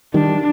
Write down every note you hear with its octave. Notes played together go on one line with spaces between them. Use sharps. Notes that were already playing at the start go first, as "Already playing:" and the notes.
D#3 G3 D4